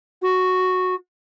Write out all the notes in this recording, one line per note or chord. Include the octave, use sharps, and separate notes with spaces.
F#4